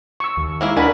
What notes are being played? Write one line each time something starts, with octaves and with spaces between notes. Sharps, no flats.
C#6 E6
D#2
G#3 A#3 E4
D4 F#4 A#4 B4 G#5 B5